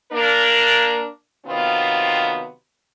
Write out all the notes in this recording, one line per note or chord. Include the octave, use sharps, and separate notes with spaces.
A#3 D4 A#4
C3 D#3 F#3 B3 C4 F4